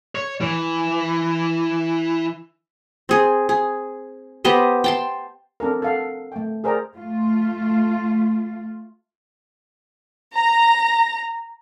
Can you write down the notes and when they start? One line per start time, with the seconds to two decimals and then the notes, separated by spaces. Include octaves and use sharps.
0.15 C#5
0.41 E3
3.09 C4 G#4
3.49 G#4
4.44 B3 G4 C5 D#5
4.84 G5 A5 C6
5.60 C4 D4 A4 A#4
5.82 A4 F5 F#5
6.32 A3 G5
6.64 G#4 A#4 C5 D5 G5 A#5
6.94 A3 F4
10.35 A#5